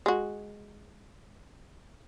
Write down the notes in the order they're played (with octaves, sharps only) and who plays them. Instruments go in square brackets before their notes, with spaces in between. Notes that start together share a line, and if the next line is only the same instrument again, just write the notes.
[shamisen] G#3 F#4